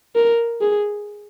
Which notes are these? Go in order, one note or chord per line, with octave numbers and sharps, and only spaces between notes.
A#4
G#4